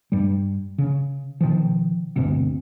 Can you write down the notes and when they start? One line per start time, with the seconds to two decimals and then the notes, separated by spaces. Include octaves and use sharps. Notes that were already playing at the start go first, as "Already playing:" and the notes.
0.12 G2 G3
0.78 C#3
1.41 B2 D#3 F3
2.16 D2 G2 B2 C4